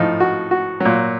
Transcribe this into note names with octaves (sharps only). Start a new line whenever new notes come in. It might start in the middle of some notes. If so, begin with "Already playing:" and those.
Already playing: A2 F3 D#4
F#4
F#4
A#2 F#3